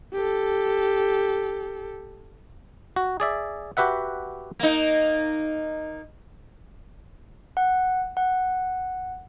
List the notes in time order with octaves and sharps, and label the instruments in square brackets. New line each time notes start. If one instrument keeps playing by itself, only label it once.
[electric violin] G4 A4
[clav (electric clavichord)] F#4
G#4 D5 E5
F#4 G4 B4 E5 F#5
[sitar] A#3 D#4
[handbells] F#5
F#5